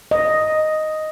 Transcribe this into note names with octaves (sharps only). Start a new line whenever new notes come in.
D#5